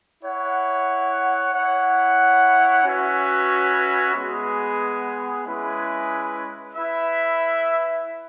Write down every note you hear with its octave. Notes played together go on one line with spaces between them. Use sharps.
E4 C#5 F#5
E4 C#5 F#5
C#4 F#4 B4 E5
G#3 B3 G#4
G#3 C#4 E4 G#4 B4
E4 B4 E5